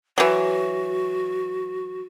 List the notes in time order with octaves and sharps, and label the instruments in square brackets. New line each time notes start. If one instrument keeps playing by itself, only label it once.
[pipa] E3 F#3 [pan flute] F#4